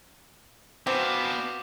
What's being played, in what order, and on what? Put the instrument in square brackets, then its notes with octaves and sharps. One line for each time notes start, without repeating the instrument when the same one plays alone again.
[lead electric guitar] B3 D4 [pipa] C4 [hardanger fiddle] F#4 F5 [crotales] D6 E7